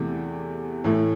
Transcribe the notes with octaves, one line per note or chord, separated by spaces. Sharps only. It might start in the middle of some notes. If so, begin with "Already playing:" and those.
Already playing: E2 C3 E3 A3
A2 E3 A3 E4